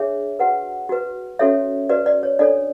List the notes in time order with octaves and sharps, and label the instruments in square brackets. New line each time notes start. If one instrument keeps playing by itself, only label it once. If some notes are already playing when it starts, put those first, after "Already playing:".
Already playing: [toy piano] D4 G#4 C#5 E5
F#4 B4 F#5
F#4 B4
C#4 F#4 A4 C#5 E5
F#4 B4 D5
D5
C#5
D4 A4 C#5 D5